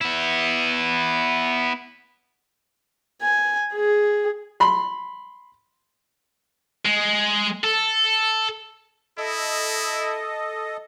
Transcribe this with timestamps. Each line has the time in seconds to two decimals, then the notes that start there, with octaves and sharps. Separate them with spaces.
0.01 B3 E4
3.22 G#5
3.74 G#4
4.60 B5 C6
6.85 G#3
7.64 A4
9.18 E4 A4 D#5